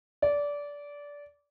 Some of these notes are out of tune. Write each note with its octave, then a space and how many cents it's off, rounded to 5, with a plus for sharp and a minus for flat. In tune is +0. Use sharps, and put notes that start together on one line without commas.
D5 -20